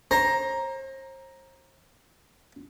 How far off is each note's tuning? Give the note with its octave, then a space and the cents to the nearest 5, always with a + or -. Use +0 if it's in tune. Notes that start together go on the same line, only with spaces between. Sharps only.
C5 +40 A#5 +5